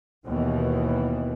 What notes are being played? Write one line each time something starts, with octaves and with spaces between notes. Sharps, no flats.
D#2 B2 E3